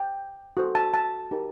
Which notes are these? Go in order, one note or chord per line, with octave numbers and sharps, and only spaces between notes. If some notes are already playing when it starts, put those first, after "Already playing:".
Already playing: G5
F#4 A4 C5
A5
A5
D#4 G4 A#4